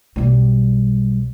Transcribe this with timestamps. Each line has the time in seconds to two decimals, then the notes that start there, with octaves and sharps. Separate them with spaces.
0.16 B1 G3